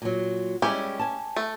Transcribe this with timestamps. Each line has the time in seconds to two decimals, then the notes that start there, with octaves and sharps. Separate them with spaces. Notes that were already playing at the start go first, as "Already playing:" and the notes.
0.02 A#2 F#3
0.62 G3 G#3 C#4 E4 G4
0.99 G#5 A5
1.36 A3